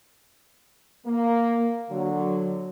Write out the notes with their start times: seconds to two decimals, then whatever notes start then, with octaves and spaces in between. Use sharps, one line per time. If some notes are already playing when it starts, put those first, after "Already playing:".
1.06 A#3
1.90 D3 F#3